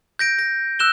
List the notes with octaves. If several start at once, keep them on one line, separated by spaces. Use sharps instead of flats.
G6 A#6 D7
A#6
E6 F#6 E7 G7